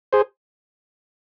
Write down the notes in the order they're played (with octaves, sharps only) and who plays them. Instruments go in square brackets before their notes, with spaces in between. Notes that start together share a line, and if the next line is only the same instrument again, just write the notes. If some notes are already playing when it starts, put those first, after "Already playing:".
[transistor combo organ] G#4 C5